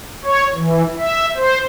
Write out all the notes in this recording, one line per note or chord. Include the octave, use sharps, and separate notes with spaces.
C#5
E3
E5
C5